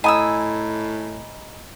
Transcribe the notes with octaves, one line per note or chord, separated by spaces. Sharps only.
A2 D#5 G#5 A#5 B5 D#6 E6